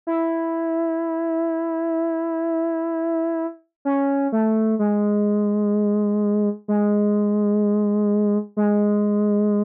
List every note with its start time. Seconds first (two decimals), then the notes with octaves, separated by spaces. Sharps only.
0.07 E4
3.85 C#4
4.32 A3
4.79 G#3
6.68 G#3
8.57 G#3